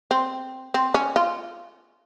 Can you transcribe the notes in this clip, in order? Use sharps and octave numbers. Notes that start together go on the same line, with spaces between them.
C4
C4
C#4
F4